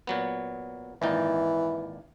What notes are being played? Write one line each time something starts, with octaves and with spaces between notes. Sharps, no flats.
A#2 F#3 B3
G#1 A#2 E3 D#4